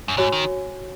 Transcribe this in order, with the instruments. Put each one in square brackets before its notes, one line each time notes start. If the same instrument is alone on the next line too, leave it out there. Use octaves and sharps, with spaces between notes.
[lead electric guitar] F#2
[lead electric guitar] G#2 [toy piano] F#4 C#5 G#5 C#6
[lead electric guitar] D#3